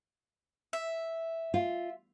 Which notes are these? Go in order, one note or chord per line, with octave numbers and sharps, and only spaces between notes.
E5
F4